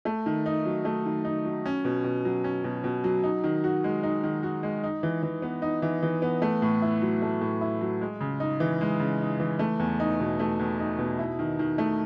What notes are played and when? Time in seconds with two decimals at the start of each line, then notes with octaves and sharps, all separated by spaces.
0.05 A3
0.26 D#3
0.46 D#4
0.66 F#3
0.85 A3
1.06 D#3
1.25 D#4
1.45 F#3
1.66 C#4
1.85 B2
2.04 B2
2.25 F#3
2.44 C#4
2.64 B2
2.84 B2
3.04 F#3
3.24 D#4
3.44 D#3
3.64 F#4
3.84 G#3
4.03 D#4
4.23 D#3
4.43 F#4
4.63 G#3
4.84 D#4
5.03 E3
5.23 E3
5.42 B3
5.62 D#4
5.82 E3
6.03 E3
6.22 B3
6.42 A3
6.62 A2
6.82 E4
7.02 F#3
7.22 A3
7.41 A2
7.61 E4
7.81 F#3
8.01 G#3
8.21 C#3
8.40 D#4
8.60 E3
8.81 G#3
9.00 C#3
9.20 D#4
9.40 E3
9.59 A3
9.79 E2
10.00 D#4
10.20 B2
10.39 A3
10.59 E2
10.79 D#4
10.98 B2
11.19 E4
11.39 D#3
11.59 D#3
11.78 A3